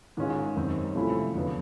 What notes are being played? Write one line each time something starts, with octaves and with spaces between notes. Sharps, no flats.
G#2 D#3 G#3 C#4 F4
F#2 D#3 G3 C4
C3 F3 A3 C#4 E4
F2 D3 F#3 B3